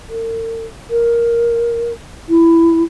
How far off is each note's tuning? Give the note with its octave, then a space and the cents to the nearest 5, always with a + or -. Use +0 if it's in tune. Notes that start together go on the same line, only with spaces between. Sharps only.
A#4 -45
A#4 +5
E4 +10